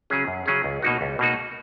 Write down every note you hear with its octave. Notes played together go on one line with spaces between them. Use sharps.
C#3 F#3 C#4 G#4
F#2
C#3 F#3 C#4 G#4
C#2
B2 A#3 D#4 F#4
C#2
B2 A#3 D#4 F#4